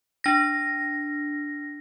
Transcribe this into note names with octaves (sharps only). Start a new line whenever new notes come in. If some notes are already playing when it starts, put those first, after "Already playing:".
D4 A#6